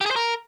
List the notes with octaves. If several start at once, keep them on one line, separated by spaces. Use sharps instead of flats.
G4
G#4
C5
A#4